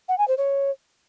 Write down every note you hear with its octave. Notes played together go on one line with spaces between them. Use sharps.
F#5
G#5
C5
C#5